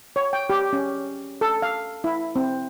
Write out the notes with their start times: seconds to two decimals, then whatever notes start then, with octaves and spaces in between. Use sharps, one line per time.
0.16 C#5
0.33 G5
0.50 G4
0.73 C#4
1.41 A4
1.62 F5
2.04 E4
2.36 C4